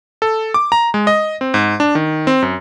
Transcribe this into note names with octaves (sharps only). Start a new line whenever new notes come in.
A4
D6
A#5
G#3
D#5
C4
G#2
D4
D#3
C4
F#2